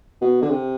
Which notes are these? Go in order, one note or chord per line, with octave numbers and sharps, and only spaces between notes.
B2
D3
C3